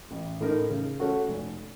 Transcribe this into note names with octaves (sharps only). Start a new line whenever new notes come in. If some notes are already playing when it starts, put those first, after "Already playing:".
A1
A2 A3 D#4 A#4
C#3
A3 C#4 F#4 A4
F1